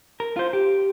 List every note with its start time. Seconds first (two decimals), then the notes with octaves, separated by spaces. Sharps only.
0.20 A#4
0.36 F4 C5
0.53 G4